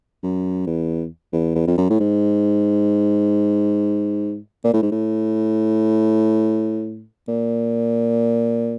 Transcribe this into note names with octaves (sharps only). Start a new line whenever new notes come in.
F#2
E2
E2
E2
F2
F#2
A2
G#2
A#2
A2
G#2
A2
A#2